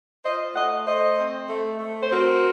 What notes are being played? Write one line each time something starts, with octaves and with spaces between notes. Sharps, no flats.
F4 C5 D#5
A3 D#5 F#5
A3 C5 D#5
C4
A3
A3
C5
C4 F#4 A#4